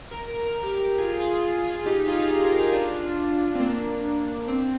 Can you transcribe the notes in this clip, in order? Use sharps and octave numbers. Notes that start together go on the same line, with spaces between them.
A#4
A#4
A#4
G4 A#4
F4 G#4
F4 G#4
F4 G#4
D#4 G4
F4 G#4
F4 G#4
G4 A#4
F4 G#4
D4 F4
C4
A#3 D4
C4